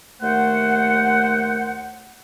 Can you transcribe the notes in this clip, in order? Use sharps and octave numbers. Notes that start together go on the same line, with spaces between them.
D#2 A3 C5 F#5